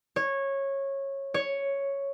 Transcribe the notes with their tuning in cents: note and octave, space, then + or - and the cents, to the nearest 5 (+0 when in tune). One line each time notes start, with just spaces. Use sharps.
C#5 -15
C#5 +0